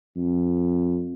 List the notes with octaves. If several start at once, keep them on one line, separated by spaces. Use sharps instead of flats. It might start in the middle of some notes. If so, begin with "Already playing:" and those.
F2